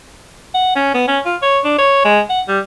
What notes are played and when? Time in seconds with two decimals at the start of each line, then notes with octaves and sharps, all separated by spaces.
0.54 F#5
0.76 C#4
0.94 B3
1.08 C#4
1.25 F4
1.42 C#5
1.64 D4
1.78 C#5
2.04 G#3
2.30 F#5
2.48 G3